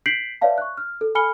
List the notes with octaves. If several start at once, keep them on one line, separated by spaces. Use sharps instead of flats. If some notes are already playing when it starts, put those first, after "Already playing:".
G6 B6 C7 D7 F#7
B4 C#5 D5 E5 F5 A5
C#6 F#6
F6
A4
A4 G#5 B5 F6 C#7 G7